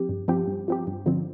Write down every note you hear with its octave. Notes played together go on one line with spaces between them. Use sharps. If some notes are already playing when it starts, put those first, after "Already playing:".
Already playing: F3 C4 G4
G2
F3 C4 G4
G2
F3 C4 G4
G2
D3 F3 C4